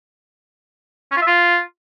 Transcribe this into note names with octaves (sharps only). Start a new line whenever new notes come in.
C#4
F4
E5
F4